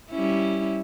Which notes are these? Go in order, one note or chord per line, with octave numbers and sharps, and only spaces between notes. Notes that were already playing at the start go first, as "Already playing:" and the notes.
G3 C#4 E4